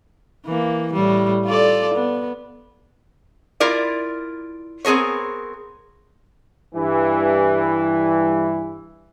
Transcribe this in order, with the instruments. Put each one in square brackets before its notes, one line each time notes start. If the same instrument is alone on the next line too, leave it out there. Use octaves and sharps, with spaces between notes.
[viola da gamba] E3 A#3
A2 G3
F4 A4 D5
B3
[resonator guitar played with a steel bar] E4 F4 A#4 D5
B3 C4 G#4 A#4 C#5
[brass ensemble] G2 E3